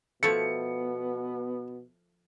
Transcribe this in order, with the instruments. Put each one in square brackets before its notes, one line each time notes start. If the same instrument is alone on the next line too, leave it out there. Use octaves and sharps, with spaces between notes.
[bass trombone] B2 [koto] F3 A3 E4 [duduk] B3 [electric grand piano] C#7